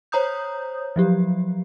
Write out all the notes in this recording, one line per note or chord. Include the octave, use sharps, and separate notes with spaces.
C5 C#5 A#5 D#6 G6
F3 F#3 G4